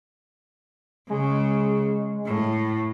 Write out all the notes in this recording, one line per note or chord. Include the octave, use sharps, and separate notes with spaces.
C#3 G#3
A2